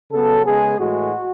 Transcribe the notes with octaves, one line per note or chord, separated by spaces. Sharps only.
C#3 F#3 B3 A4
C#3 G#3 B3 G#4
A2 E3 G#3 F#4